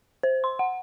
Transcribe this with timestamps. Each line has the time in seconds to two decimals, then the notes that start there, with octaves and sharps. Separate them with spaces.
0.23 C5
0.44 C6
0.59 F#5